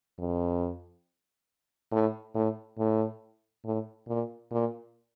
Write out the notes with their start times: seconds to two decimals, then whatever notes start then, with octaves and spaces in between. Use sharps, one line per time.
0.18 F2
1.92 A2
2.35 A2
2.78 A2
3.65 A2
4.08 A#2
4.52 A#2